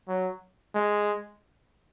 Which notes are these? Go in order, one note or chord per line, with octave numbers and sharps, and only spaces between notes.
F#3
G#3